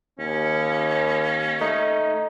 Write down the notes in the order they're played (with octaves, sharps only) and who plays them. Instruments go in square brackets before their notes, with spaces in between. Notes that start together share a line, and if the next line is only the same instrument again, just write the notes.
[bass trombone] D#2 [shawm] C#4
[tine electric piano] A3 D#4